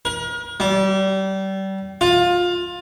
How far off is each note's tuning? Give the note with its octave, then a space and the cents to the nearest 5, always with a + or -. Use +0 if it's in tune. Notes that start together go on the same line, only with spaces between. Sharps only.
A#4 +35
G3 -30
F4 +20